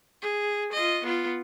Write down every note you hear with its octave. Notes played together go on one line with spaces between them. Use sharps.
G#4
F4 D#5
B3 F4